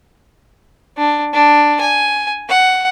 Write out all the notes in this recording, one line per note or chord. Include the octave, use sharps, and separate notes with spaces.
D4
D4
G#5
F#5